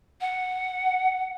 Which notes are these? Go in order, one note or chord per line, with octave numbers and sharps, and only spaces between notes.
F#5